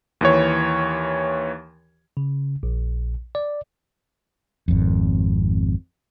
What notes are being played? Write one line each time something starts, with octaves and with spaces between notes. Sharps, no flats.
D#2 E3 C#5
C#3
A#1
D5
G#1 F2